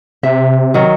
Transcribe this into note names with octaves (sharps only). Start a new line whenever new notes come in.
C3 E5
D#3 F#3